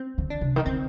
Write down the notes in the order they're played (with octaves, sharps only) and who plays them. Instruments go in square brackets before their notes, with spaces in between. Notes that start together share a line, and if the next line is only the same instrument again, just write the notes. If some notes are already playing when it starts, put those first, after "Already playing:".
Already playing: [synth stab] C4
[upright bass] D3
[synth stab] D4
[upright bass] C3
D#3
[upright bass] D3 [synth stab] C4